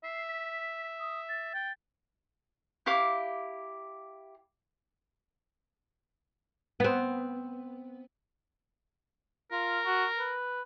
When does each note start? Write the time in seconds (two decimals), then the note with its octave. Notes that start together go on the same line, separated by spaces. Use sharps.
0.04 E5 C7
0.27 B6
0.99 D#6
1.28 A6
1.54 G5
2.86 E4 G4 F5 D6
6.80 B3 C4
9.52 F4 A#4
9.86 F#4
10.18 B4